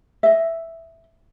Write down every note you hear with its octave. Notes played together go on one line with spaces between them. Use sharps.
D#5 E5